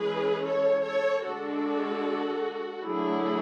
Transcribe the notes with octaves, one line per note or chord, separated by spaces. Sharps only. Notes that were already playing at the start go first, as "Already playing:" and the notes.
Already playing: E3 G#3 C#4 G#4 B4
A4 C#5
A4 C#5
D3 G#3 D4 F#4 A4
D3 F#3 A3 E4 G#4